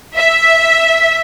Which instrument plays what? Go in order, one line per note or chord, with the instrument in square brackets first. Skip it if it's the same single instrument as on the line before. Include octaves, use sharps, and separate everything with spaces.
[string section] E5